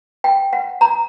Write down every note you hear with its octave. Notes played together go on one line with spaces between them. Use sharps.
G5
F#5
A#5